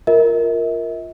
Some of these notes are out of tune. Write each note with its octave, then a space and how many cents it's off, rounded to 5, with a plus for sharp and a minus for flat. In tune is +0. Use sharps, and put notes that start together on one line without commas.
F4 +0 A#4 +0 E5 -45